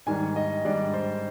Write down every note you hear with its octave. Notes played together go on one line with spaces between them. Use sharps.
G#2 D#3 G3 D4 G#5
D#5
G#2 D#3 G3 D4 D5
C5